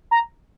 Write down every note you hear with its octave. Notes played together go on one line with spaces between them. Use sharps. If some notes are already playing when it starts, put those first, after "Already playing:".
A#5